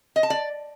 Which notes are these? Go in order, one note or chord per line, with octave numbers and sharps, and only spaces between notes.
D#5
A5
D5